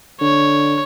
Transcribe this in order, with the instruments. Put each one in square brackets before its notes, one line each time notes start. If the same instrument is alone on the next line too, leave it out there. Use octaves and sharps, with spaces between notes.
[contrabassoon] D3 [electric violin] C#5